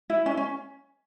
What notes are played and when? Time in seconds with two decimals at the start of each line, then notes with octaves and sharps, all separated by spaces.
0.10 E4
0.26 C#4
0.37 C#4